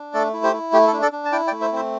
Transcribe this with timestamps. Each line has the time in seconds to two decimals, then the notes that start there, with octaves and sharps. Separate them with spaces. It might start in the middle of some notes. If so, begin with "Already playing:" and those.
Already playing: D4
0.14 A3 A4 D5
0.34 E4
0.43 G4 C5
0.53 E4
0.73 A3 G4
0.87 A4
0.93 D4
1.02 A4 D5
1.12 D4
1.25 A5
1.32 E4 D5 G5
1.47 D5 G5
1.52 A3
1.61 C5 E5
1.72 C4 C5 E5